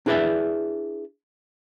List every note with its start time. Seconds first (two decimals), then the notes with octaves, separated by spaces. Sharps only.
0.06 D4 E4 G#4 B4 D5 E5